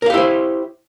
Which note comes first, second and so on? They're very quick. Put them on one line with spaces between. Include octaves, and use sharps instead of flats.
A#4 F5 G4 E4 C5